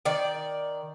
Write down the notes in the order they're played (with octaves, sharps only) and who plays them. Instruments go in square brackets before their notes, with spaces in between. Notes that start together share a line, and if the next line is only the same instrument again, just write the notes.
[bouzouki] D#3 D5